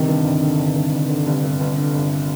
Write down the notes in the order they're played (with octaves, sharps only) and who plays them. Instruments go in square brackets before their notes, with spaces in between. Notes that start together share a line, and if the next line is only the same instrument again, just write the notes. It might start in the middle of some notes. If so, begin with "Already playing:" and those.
Already playing: [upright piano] G1 [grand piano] C3 D#3
[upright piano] G2
G1
D3
G1
G2
G1
D3
[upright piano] G1 [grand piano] C3
[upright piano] G2
G1
D3
G1